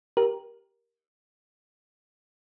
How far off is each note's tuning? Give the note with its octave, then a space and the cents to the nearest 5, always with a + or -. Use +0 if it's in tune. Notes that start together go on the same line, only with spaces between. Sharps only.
G4 +0 A#4 +15